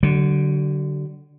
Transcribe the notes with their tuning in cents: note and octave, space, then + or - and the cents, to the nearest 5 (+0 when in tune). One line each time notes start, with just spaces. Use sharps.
D3 +0 F#3 +40